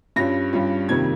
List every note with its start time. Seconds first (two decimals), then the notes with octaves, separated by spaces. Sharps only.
0.16 G2 G3 C#4 F4 A#6
0.53 G2 G3 C#4 F4
0.89 F2 C3 D#3 G3 A#3 G#6